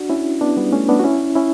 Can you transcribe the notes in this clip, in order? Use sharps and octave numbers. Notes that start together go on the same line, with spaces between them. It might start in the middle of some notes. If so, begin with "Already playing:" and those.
Already playing: D4 F#4
C#4 E4
B3 D4
G3 B3
A3 C#4
B3 D4
F#4
C#4 E4
C#4 E4